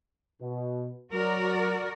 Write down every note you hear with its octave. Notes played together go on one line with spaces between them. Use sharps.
B2
F#3 F#4 A#4 D5